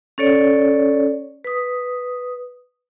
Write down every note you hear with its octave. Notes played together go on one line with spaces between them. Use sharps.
C#4 A4 C#5 D5
B4 D#6